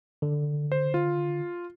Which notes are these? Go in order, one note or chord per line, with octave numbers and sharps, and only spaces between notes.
D3
C5
F4